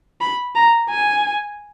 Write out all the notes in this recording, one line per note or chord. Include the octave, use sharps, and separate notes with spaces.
B5
A#5
G#5